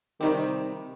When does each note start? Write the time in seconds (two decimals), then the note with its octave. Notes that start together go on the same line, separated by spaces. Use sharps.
0.20 C3 D#3 G3 C4 G4